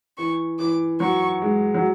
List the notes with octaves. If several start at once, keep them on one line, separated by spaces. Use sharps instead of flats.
E3 C#6
E3 D6
F#3 C#6
G#3
F#3